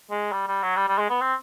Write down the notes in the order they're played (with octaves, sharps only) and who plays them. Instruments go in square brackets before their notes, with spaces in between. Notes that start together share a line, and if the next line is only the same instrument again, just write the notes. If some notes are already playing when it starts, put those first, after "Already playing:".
[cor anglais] G#3
G3
G3
F#3
G3
G3
G#3
B3
C4